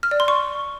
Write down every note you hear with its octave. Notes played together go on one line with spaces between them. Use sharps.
F6
D5
C6
C#6